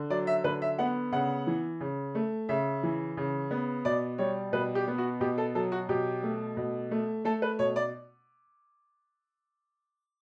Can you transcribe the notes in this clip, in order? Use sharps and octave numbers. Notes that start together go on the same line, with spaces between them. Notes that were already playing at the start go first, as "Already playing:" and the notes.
Already playing: D3
F#3 D5
E5
D3 B4
E5
B3 F#5
C#3 F#5
E3
C#3
A3
C#3 E5
E3
C#3
B3
B2 D5
G3 C#5
B2 B4
G4
B3
F#4
B2 G4
A4
F#3 A4
F#4
B2 G4
A3
B2
A3
A3 A4
B4
B2 C#5
D5